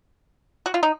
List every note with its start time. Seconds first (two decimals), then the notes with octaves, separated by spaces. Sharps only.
0.66 F#4
0.74 F4
0.83 D#4